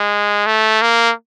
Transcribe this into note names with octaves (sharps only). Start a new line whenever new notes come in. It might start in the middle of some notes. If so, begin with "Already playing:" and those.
Already playing: G#3
A3
A#3